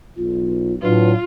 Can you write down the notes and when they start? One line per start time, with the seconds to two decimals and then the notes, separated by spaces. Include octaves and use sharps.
0.17 B1 F4
0.82 A2 F#3 D4 F4 B4